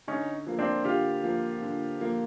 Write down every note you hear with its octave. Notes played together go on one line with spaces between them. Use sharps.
D3 C#4 D#4
F3 A#3
C4 D4
D3 F4 G4
F3 A#3
D3
F3 A#3